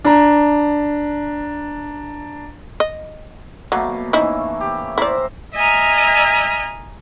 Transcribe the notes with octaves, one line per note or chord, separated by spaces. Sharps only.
D4 A#5
D#5
B2 F#3 A3 A#3
E3 C#4 D#4 E4
G4
E4 A#4 C5 D5 E5
D#5 E5 G#5 A#5 F6